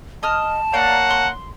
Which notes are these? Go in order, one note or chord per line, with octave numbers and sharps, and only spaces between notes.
D#5 A5 D#6 F6
A#3 C#5 D5 F5 F#5 A#5
C6